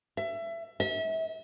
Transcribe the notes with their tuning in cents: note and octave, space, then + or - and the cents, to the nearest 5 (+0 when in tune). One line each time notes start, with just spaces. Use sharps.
E5 +25
E5 -30